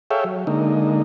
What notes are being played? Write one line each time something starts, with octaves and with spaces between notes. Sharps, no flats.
G#4 A4 C#5 E5 F5 G5
F#3
D3 G#3 A#3 D#4